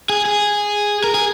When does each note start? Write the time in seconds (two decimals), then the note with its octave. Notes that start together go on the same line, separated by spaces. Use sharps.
0.09 G#4
0.25 G#4
1.04 A#4
1.14 G#4